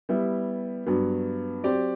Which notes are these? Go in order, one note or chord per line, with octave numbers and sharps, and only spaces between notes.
G3 B3 E4
G2 F#3 B3
F#3 C4 G4 D5